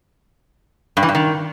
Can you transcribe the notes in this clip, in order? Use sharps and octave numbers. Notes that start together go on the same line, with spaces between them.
G2
E3
G2
D#3